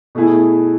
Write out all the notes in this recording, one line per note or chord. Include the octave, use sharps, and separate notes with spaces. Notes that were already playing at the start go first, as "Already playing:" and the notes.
B2 A3 E4 G#4